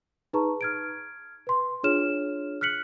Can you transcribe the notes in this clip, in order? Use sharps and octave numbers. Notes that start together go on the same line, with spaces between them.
D#4 G#4 B4 A5 A#5 C#6
F6 G#6 D7
B4 C6
D4 F4 G#4 C#5 F6 E7
F6 F#6 B6 C#7 F#7